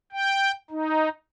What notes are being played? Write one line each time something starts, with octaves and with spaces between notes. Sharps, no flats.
G5
D#4